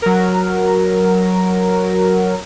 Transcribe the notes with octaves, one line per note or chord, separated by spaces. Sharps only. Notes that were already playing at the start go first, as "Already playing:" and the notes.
F#3 A#4